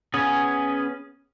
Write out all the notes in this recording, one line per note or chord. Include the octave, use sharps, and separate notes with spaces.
B3 C#4 G#4